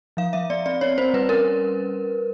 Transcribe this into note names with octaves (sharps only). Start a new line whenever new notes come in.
F3 F5
F3 E5
B3 D5
C4 D5
C4 C#5
C4 C5
G3 B4
C#4 A#4